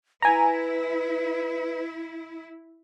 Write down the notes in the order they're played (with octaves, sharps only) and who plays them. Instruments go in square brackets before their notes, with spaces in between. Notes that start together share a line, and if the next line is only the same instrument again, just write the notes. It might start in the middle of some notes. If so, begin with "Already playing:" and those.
[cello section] E4 [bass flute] B4 [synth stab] G#5 A#5